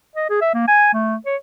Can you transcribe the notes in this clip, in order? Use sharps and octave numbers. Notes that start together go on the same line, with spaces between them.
D#5
G#4
E5
A#3
G#5
A3
C#5